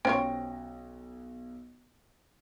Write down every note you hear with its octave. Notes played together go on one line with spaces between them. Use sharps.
B1 C#4 F4 C5 C#5 G5 A#6